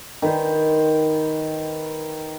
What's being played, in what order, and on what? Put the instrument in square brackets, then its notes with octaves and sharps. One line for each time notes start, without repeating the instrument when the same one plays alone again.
[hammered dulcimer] D#3 B4 C5